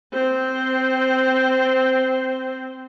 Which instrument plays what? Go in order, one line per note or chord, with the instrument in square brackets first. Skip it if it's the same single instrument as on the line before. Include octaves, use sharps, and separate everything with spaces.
[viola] C4 C5